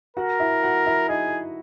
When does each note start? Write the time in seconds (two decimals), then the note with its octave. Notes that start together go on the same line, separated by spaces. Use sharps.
0.17 F#4 A#4 F#5
0.40 E4 E5
0.63 F#4 F#5
0.86 E4 E5
1.09 D#4 G#4 D#5